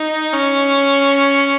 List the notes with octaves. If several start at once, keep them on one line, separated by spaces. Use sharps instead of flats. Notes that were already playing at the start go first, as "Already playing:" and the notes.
Already playing: D#4
C#4